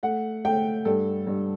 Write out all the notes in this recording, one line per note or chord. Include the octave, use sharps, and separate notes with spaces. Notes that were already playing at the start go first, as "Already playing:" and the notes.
A3 F#5
A3 G5
G2 A4
G2